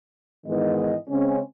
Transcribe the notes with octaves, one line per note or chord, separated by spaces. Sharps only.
G#2 D#3 E3 G#3 B3 D#5
C#3 G#3 C4 C#4